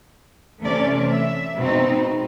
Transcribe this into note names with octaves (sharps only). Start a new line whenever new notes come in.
C3 E3 A3 C#4 D5
E5
B2 G#3 C4 D#4